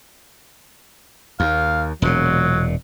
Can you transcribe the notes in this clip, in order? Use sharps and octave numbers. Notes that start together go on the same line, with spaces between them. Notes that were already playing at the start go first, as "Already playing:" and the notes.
D#2 F5
E1 A#2 F#3